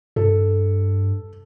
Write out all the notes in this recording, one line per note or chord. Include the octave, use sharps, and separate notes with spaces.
G2 A4